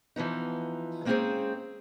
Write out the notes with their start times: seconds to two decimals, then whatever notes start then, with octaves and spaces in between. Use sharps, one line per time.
0.16 E3 F3 B3 D#4
1.05 G#3 A#3 C4 C#4 G#4 C5